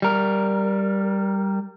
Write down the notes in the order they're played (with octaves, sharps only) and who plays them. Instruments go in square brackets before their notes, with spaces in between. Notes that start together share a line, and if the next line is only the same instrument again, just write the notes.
[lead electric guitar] G3 A#4